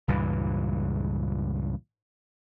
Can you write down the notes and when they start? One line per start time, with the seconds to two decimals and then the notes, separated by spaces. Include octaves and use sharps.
0.08 C#2 G2 A#2 E3